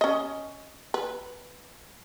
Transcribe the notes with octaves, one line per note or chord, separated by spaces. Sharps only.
C#4 D#5
B4